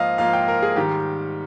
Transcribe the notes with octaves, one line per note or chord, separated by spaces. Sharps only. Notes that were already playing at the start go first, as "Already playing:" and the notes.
Already playing: G#2 F3 A#3 F4 D#5 F5
G#2 F3 A#3 F4 F5
G5
A#4
G#4
G#2 D#3 G3 G4